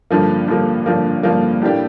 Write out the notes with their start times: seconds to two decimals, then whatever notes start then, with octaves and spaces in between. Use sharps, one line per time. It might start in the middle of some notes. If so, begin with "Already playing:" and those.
0.10 G2 D3 F3 A#3
0.48 G2 D3 F3 A#3
0.86 G2 D3 F3 A#3
1.23 G2 D3 F3 A#3
1.62 A2 G3 A#3 D4 G4